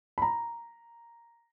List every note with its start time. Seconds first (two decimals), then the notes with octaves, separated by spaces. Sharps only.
0.18 B5
0.22 A#5